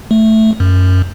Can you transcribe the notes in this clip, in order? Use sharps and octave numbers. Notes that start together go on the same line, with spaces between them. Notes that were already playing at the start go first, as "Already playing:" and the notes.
A3
F#2